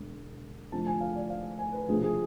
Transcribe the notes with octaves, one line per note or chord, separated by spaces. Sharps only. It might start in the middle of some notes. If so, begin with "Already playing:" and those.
Already playing: E1 D3
F1 F2 D3 F3 A5
G#5
F5
D5
F5
G#5
B4
E1 D2 C3 F3 G#4
G#4